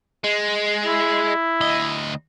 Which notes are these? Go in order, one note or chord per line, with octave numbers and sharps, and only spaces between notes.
G#3
E4
D2 D#5